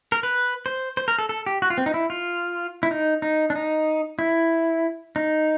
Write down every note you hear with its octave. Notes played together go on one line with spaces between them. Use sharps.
A#4
B4
C5
C5
A#4
A4
A4
G4
F#4
F4
C4
D#4
E4
F4
E4
D#4
D#4
D4
D#4
E4
D#4